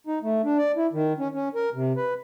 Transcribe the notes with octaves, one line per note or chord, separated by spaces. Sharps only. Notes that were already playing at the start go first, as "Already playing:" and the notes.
D#4
A3
D4
D5
E4
D#3
C#4
C#4
A#4
C3
B4